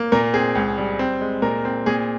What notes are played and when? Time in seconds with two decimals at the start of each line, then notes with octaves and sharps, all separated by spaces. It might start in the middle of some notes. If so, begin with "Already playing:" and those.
Already playing: A#3
0.12 A#2 A#4
0.34 C4 G#4
0.55 C#2
0.78 G3
0.99 C4
1.21 G#3
1.42 A#2 A#4
1.65 C4
1.86 A#2 G#4